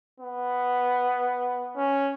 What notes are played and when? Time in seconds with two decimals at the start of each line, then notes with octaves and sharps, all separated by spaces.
0.20 B3
1.77 C#4